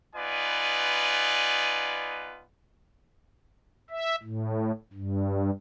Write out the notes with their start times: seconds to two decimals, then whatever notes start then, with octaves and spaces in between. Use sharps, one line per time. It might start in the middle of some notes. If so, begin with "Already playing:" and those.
0.16 B3 D#4 F4 B4 D5 G#5
3.90 E5
4.23 A2
4.93 G2